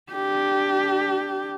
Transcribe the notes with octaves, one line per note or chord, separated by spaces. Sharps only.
D4 G4